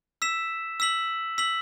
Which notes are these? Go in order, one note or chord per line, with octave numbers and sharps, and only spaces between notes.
E6 B6 E7
E6 B6 F#7
E6 B6 F#7